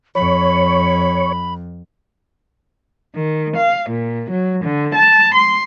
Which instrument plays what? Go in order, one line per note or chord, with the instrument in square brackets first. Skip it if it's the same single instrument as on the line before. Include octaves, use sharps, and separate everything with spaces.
[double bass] F2 [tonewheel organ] C#5 [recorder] B5
[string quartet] D#3
F5
A#2
F#3
D3
A5
C6